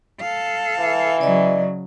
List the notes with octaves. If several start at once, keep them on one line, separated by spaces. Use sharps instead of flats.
A4 F5
E3
C#3 F#3 D5 D#5